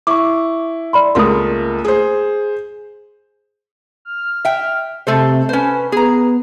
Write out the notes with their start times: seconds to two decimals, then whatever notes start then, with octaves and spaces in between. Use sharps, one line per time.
0.07 E4 C#6 D6
0.93 D5 B5 C6
1.15 C#2 A3 A#3 C6 D#6
1.85 G#4 C5
4.05 F6
4.45 E5 G5
5.07 C3 A3 A4 C5
5.49 C#4 B4 C5
5.92 B3 G#4 A#5